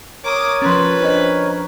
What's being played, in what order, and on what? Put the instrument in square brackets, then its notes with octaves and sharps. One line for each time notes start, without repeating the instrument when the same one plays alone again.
[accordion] A#4 C#5 [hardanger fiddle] D6 D#6
[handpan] F3 C#4 [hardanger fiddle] B4 [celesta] C6 A6
[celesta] D4 C5 D#5